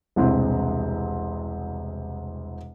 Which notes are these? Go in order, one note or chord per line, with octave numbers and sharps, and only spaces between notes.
E1 C2 C4